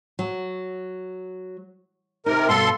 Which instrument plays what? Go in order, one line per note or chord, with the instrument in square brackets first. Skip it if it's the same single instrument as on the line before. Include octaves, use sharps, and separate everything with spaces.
[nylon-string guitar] F#3
[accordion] C3 A#4 [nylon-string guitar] D#4
[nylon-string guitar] G2 B2 [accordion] A4 C6